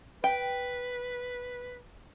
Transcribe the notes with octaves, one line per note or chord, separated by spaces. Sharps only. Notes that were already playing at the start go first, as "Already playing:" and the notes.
B4 G5